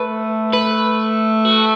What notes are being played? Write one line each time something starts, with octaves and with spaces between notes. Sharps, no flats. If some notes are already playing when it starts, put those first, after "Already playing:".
Already playing: A3 B4
B4
F#4